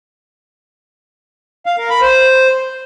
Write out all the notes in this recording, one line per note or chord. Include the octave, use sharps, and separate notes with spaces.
F5
A#4
B5
C5